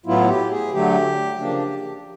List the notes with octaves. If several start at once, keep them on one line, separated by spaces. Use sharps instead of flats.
A2 F#3 B3 E4 F4
G4
G#4
D3 F#3 A3 G4
C#3 F3 A#3 D4